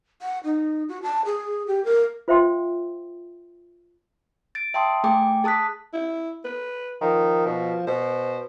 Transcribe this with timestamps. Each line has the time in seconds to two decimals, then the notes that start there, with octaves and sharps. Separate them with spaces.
0.22 F#5
0.44 D#4
0.89 F#4
1.03 A5
1.25 G#4
1.67 G4
1.85 A#4
2.28 F4 C5 E5 F5 G5 C6
4.55 A6 D7
4.74 E5 G5 A5 C6 D#6
5.04 A3 G#4 G5 G#5 D6
5.44 G#4 A5 D#6 F#6 B6
5.93 E4
6.44 B4
7.01 D#3 F3
7.46 B2
7.87 B2 C5